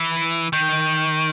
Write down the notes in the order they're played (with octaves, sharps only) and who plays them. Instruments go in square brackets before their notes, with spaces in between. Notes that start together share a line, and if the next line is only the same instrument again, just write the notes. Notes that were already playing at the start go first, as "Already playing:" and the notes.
Already playing: [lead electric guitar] E3
D#3